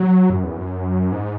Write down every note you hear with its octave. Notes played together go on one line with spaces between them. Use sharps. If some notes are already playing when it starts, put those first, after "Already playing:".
Already playing: F#3
F#2
E2
F#2
G#2